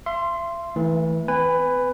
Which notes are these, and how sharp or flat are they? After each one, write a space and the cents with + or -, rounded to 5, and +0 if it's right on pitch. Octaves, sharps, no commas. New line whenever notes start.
E5 +45 C6 +0
E3 -15 A3 +0 E4 -10
C4 -45 B4 +15 G#5 -20